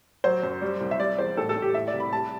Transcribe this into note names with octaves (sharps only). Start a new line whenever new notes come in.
F#3 C5
F#2
G3
C2
E5
G3 D5
E2 C5
A2 A4
A4
A2
G4
E3 E5
D5
C2
B5
G3 A5